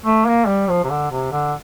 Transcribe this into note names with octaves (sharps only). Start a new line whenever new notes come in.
A3
A#3
G3
F3
C3
D3
C3
D3